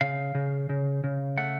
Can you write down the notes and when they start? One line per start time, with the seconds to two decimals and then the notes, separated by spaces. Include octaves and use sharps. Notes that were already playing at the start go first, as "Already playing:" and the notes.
0.01 C#3 F5
0.35 C#3
0.69 C#3
1.04 C#3
1.38 A3 F#5